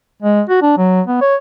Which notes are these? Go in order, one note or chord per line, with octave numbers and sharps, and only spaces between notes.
G#3
F#4
D4
F#3
B3
C#5